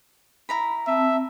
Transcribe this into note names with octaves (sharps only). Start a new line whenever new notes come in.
E4 A#5 B5
C4 E5 A5